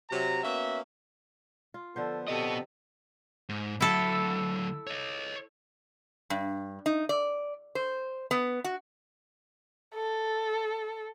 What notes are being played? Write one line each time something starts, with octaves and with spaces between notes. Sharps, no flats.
C3 F#3 A#5
A#3 B3 C#4 F#4 E5
F4
D3 F3 B3 A4 C5
C3 B3 A4 D#5
G#2
D2 F#3 E4 A4
C#5 D#5
G2
D#4
D5
C5
B3
F#4
A4